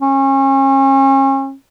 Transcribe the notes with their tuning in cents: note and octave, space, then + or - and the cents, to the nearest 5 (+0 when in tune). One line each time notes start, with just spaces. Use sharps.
C#4 -35